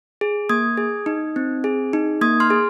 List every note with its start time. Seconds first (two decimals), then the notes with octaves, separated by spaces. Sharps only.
0.21 G#4
0.49 A#3 D#6 G#6
0.77 G#4
1.06 D#4
1.36 C4
1.64 G#4
1.93 D#4
2.21 A#3 D#6 G#6
2.40 C6 F6
2.50 G#4